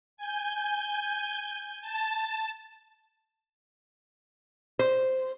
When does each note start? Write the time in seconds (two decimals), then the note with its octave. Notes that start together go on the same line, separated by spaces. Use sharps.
0.17 G#5 G6
1.81 A5
4.79 C5